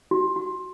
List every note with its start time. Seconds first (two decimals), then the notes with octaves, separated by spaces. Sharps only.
0.11 F#4
0.36 F#4